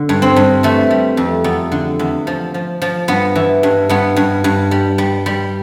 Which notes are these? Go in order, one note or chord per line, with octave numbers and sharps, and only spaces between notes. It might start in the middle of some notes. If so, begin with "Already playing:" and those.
Already playing: D3
G2
C4
G2
E3 A3
G3
F2
E2
D3
E2
F3
F3
F3
G2 B3
E3
G2
G2 B3
G2
G2
G3
G3
G3